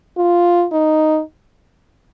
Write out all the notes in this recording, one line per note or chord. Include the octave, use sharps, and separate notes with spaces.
F4
D#4